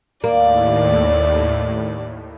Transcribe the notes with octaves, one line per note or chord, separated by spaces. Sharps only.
D#2 A2 A#3 D5